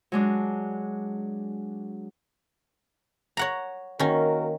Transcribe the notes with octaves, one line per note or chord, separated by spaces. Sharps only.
F#3 G#3 D4
C#5 F#5 A#5
D#3 A#3 C#4 F#4 A#4